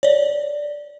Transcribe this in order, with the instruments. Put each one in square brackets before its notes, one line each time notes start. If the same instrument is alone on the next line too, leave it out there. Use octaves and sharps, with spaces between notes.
[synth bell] C#5 D5